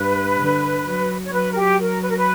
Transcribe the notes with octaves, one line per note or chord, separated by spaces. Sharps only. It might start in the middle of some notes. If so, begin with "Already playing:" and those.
Already playing: G2 B4
D3
F#3
C#5
F#3 B4
A#4
G4
A#4
B4
A#4
B4